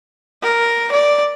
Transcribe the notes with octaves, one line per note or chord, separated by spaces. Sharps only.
A#4
D5